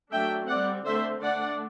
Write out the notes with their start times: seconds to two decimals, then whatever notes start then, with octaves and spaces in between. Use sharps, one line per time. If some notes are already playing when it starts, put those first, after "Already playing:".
0.11 F#3 A3 D4 E5 G5
0.48 G3 C4 D5 F#5
0.85 D3 A3 C4 C5 E5
1.23 D3 A3 D4 D5 F#5